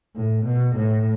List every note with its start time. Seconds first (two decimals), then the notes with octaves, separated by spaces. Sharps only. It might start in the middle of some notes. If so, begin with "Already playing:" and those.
0.16 A2
0.46 B2
0.76 A2